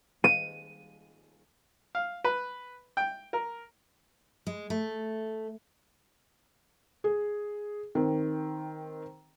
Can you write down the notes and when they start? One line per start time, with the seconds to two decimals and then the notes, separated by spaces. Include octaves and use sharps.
0.24 D#7
1.95 F5
2.24 B4
2.97 G5
3.33 A#4
4.47 G#3
4.70 A3
7.04 G#4
7.95 D#3 C4